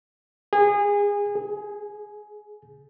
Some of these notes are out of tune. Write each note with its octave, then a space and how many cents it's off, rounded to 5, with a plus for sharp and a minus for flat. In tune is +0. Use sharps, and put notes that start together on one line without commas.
G#4 -25
G#4 +20